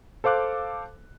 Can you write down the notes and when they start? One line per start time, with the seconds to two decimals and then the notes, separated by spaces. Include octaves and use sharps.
0.24 A4 C5 F5 D6 F#6